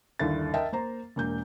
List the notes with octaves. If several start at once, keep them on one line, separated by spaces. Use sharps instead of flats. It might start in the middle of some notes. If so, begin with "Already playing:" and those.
G1 D#2 D4 E4 A4 A6
A#4 D#5 E5 G5 A5
A#3 C5 A#5
E1 A#3 G6